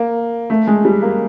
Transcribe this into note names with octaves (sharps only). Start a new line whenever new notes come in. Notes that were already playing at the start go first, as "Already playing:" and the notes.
Already playing: A#3
A3
G#3
G3
A#3